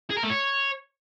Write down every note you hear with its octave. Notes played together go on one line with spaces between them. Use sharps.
G#4
A#4
A3
C#5